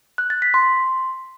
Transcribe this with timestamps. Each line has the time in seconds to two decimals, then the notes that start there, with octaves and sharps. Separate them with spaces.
0.18 F#6
0.30 A6
0.42 B6
0.54 C6